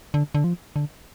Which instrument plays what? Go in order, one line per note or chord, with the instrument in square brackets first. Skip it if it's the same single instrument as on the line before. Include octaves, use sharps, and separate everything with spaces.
[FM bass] D3
D3
F3
D3